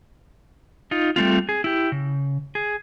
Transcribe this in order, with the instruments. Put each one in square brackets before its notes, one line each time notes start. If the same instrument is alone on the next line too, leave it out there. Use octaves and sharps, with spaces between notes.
[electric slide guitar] D#4 F4
G3 A3 C4 F4
G#4
E4 G4
C#3
G#4